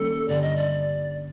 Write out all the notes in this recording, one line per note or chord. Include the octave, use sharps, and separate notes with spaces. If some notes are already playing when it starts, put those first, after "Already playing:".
Already playing: D#3 G3 A#3 C#4 A4
G2 D3 G3 D5
D#5
D5